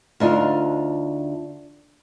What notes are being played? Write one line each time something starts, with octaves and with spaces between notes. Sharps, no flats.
D2 D4 D#4 F4